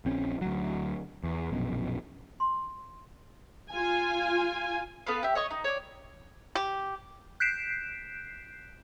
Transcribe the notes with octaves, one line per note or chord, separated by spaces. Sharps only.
A#1 C4 C#4
D2 F#3
E2
A#1 F#2 B2
C6
F4 G#5
B3 A4 B4 F5
G4 E5
C#5 D#5 C#6
D#4
C#5 D5
G4
F#6 G6 B6 C7 D7 E7